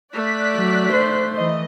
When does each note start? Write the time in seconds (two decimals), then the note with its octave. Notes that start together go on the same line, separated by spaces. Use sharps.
0.13 A3 D5 F#6 B6
0.56 F#3
0.93 C5
1.36 E3 D#5